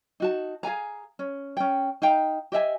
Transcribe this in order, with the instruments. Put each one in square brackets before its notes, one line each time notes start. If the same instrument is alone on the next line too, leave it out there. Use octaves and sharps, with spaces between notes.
[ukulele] D#4 F#4 A5
G#4 F5 G#5 A#5
C#4
C#4 G5
D#4 F5 G5 A#5
G4 D#5 E5 G#5